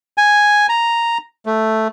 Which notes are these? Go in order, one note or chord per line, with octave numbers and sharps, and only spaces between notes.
G#5
A#5
A3